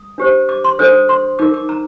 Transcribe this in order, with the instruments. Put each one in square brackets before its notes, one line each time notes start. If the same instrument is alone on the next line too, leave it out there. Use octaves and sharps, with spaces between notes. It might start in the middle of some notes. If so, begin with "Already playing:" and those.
Already playing: [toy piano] D#6
D4 G4 C5
D6
C6
D4 A4 C5 D#6
C6
D#4 A#4 D6
D6
A#5